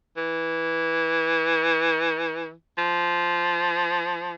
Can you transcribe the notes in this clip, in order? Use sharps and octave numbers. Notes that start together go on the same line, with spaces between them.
E3
F3